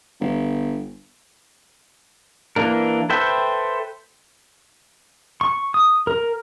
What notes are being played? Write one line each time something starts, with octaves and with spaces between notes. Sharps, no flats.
G1
E3 A#3 D4 A#4
A4 B4 C5 E5 G5
C#6
D#6
A#4